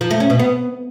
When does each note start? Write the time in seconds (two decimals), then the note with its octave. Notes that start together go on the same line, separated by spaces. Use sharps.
0.01 F3
0.10 A3
0.20 C#4
0.30 B2
0.39 B3